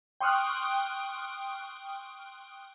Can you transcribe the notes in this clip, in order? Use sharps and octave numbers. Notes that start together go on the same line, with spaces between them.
G5 C6 C#6 D#6 F6 F#6